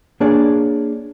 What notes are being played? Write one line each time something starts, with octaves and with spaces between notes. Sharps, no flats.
A#3 D4 G#4 C#5 D5